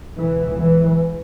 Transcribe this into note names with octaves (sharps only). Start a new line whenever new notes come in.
C#2 B2 E3
E3